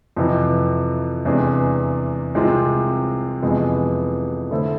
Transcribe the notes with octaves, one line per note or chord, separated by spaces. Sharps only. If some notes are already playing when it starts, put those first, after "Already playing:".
F2 C3 E3
E2 C3 G#3 D4 G#4
C2 C3 G#3 C4 F4
F2 C3 E3 G#3 B3
D3 A3 E4 A4 C5